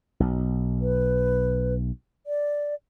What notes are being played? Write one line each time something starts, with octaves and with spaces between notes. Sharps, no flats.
B1
B4
D5